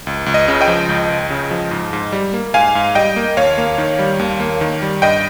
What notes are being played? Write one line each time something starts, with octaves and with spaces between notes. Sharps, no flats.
C#2
C#2
D#5
C#3
D#5 G5
F3
C#2
C#2
C#3
F3
G#2
G#2
G3
A#3
G#2 F5 G#5
G#2
G3 D#5 G5
A#3
D#2 C#5 F5
A#3
D#3
G3
D#2
A#3
D#3
G3
G2 D#5 G5